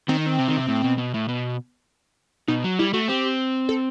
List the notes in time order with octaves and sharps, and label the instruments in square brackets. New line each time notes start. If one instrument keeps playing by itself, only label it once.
[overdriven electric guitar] D#3 [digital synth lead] C4
[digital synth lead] D#4
C4
[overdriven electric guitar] C3
D#3
C3
A2
B2
B2
A2
B2
[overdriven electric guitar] B2 [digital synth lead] D#4
[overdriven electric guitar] F#3
[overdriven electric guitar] G3 [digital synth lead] E4
[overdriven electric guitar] A3 [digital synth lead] F#4
[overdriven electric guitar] C4 [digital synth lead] G4
[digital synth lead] A4